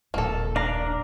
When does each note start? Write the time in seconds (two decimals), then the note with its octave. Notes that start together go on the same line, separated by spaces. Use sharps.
0.14 D#1 A#1 A#3 A4
0.56 D4 F5 A#5